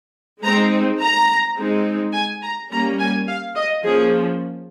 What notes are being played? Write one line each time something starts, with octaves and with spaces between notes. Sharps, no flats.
G#3 C4 D#4 A#5
A#5
G#3 C4 D#4
G#5
A#5
G3 A#3 C#4 A#5
G#5
F5
D#5
F3 A#3 C#4 G#4